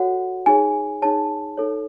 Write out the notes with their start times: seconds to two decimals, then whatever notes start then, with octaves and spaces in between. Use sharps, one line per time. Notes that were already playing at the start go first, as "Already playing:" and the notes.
Already playing: F#4 A4 C#5 F#5
0.46 D#4 G#4 C#5 G#5
1.02 D#4 G#4 C#5 A5
1.57 D#4 A4 C#5